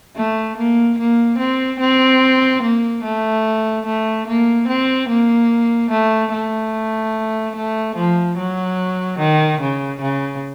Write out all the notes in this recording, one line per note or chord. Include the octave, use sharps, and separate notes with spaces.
A3
A#3
A#3
C4
C4
A#3
A3
A3
A#3
C4
A#3
A3
A3
A3
F3
F#3
D#3
C#3
C#3